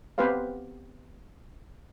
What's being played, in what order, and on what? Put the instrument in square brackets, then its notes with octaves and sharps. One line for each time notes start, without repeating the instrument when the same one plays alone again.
[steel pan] B3 C4 G4 B4 C5 F5